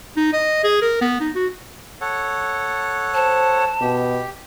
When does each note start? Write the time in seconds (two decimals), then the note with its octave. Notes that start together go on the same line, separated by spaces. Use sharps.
0.17 D#4
0.33 D#5
0.64 G#4
0.82 A#4
1.01 B3
1.20 D#4
1.35 F#4
2.01 A4 C#5 F#5
3.14 C5 A5
3.81 B2 G4